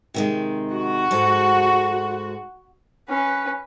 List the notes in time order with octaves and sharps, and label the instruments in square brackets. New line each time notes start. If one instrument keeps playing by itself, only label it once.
[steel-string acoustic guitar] C3 D#3 G#3
[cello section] F#4
[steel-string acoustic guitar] G#2 G#3 A4
[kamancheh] C#4 B4